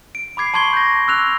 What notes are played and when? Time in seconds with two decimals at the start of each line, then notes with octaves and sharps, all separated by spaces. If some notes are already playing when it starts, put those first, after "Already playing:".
0.15 D7
0.37 B5 D6 G#6 C7
0.54 A5 C6 C#6 G#6 C7 G7
0.73 G6 A#6
1.08 E6 F#6 F7